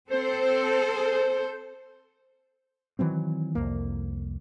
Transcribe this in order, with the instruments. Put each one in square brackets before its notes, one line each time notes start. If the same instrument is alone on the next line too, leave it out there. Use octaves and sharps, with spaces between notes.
[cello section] C4 A4 [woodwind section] C5
[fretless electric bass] D#3 E3 F#3 C4
C2 F2 A#3